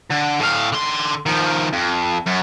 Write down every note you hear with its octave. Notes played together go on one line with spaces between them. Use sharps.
D3
A2 F5
D3 C6
D#3 F3
F2
F#2